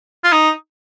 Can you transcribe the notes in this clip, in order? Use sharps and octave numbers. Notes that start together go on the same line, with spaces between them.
F4
D#4